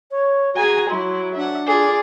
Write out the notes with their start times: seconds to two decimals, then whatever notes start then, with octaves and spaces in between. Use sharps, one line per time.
0.11 C#5
0.54 F#4 G#4 G#5 A#5
0.89 F#3 E4 C6
1.35 D4 E5 F#5
1.67 F4 G#4 D5